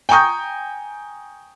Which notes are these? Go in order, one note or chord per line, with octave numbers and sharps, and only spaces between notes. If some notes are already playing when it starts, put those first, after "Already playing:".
G5 G#5 A#5 C#6 D#6 G6